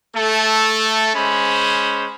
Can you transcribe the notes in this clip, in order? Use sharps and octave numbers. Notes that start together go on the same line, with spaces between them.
A3 A4
G#3 C#4 C5 B5